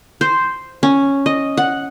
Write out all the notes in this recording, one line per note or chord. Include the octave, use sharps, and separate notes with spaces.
C5
C#4
D#5
F#5